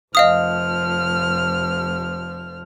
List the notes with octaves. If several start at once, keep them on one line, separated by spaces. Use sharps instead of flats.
F1 F3 D#5 F5 D#6 F6